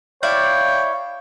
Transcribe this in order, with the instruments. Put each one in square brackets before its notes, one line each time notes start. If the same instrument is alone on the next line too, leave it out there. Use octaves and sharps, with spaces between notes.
[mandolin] E4 D5 F5 [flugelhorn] C#5 [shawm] G5